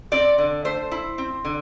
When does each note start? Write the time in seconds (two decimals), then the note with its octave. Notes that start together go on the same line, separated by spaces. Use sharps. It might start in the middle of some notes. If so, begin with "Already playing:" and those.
0.12 C4 D5
0.38 D3
0.65 A3 C5
0.91 E4
1.18 C4
1.45 D3